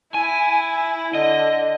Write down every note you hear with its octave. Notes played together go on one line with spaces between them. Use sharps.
E4 G#5
D3 D#5